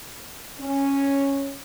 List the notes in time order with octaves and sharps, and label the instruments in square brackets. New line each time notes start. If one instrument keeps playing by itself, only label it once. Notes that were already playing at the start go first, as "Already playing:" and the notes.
[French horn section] C#4